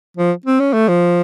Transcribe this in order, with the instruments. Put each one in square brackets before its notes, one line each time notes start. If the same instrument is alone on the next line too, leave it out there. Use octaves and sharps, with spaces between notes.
[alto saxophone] F3
C4
C#4
A3
F3